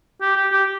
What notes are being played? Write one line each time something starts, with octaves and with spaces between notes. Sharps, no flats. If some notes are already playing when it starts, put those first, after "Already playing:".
G4
G4
G4